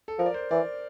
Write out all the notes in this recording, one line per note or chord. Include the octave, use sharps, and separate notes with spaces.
A4
F3 A#4
D5
C5
E3 D5